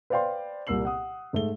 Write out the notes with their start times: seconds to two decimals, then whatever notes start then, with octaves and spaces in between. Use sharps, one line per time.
0.10 B4 C5 D5 F5 G5 C6
0.67 C2 A#2 A#3 E6 C7 F#7
0.85 F#5 D#6
1.33 G#2 A3 E5 G7